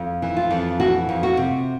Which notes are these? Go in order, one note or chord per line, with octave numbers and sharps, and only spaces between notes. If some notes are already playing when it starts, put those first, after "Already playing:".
Already playing: F2
E3
F4
F2
E3 F#4
F2
F#4
C3